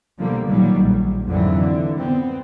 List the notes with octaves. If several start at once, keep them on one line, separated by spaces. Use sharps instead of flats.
B2 D3 F3 G3 A#3
A#2 D#3 F#3 G3
A#1
F2 G#2 D3 E3 F#3
D3
B3 C4